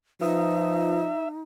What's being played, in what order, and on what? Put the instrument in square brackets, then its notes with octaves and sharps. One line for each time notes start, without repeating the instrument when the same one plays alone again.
[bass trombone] F3 [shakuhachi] D#4 [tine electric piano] F4 B4 D#6 [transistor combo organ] E5